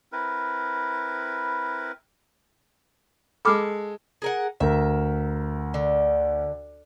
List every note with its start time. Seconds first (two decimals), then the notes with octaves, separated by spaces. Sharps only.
0.12 C4 E4 A#4 B4
3.45 G#3 A4 B5 D6 F6
4.22 G#4 A#4 F#5
4.60 D2 A#4 E5
5.74 D3